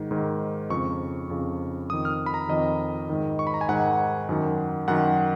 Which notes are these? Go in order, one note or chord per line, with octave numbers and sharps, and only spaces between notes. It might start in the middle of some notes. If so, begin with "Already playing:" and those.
Already playing: G#2 D#3
G#2 D#3
F2 C#3 C#6
F2 C#3
F2 D#3 D#6
F6
B5
A#5
F2 D#3 D#5
G#2 D#3
C#6
B5
A#5
G#5
G#2 D#3 F#5
F#2 D#3
F#2 D#3 F#5